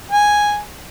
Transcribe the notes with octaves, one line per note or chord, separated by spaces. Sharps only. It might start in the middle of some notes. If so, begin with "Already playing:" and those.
G#5